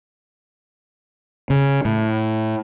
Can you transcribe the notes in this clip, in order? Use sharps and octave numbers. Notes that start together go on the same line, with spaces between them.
C#3
A2